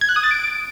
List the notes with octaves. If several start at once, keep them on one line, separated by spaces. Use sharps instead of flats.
G#6
F#6
D#6
A6
D7